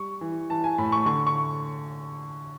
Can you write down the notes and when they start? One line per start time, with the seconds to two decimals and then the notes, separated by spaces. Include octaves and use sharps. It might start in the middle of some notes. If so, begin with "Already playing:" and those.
Already playing: G3 C#6
0.21 E3
0.50 E3 A5
0.64 G#5
0.78 A2 B5
0.92 C#6
1.06 D3 C#6
1.27 C#6